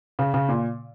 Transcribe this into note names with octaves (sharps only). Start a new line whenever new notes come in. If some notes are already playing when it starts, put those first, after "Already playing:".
C#3
C#3
A#2